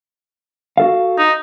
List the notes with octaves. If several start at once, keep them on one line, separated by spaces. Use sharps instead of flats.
F#4 A4 F5
D#4